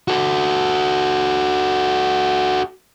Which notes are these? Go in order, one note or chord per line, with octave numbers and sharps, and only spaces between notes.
F#4 A4